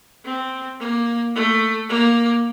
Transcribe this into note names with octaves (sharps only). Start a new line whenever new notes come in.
C4
A#3
A3
A#3